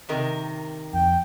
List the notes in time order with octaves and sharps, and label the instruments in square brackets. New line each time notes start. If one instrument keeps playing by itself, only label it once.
[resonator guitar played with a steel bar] C3 D#3 A#4
[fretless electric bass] F2 [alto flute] G5